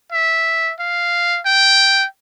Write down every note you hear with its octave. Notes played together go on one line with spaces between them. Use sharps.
E5
F5
G5